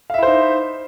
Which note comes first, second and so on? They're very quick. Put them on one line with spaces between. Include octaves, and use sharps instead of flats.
F5 E5 E4 C5 D#4